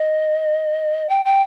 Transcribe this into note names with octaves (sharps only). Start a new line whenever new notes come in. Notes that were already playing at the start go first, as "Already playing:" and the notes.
Already playing: D#5
G5
G5